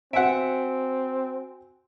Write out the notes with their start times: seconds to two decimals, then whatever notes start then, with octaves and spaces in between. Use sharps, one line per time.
0.13 C4 F#4 E5 F#5 G#5 D7